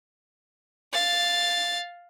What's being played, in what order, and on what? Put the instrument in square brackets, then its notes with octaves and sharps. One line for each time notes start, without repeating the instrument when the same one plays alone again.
[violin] F5 A6